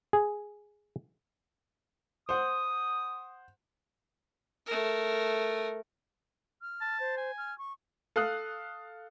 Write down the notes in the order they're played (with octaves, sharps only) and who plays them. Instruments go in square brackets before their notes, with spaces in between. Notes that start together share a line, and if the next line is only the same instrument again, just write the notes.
[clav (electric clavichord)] G#4
[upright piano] C5 F#5 [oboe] D#6
[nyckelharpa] A3 A#4
[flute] F6
[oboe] A5
[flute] C5
[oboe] G#5
[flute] F6
C#6
[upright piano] A4 F5 D#6 F#6